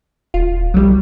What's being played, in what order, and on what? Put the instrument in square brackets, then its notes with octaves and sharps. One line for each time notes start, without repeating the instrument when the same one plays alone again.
[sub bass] D#1 [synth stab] F4
[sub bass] B1 [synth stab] F#3 G3